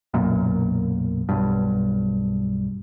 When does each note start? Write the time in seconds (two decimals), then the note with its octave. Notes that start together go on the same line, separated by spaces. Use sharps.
0.14 B1 F#2 A#2
1.29 B1 G2